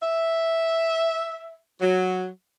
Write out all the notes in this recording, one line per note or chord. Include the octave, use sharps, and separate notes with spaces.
E5
F#3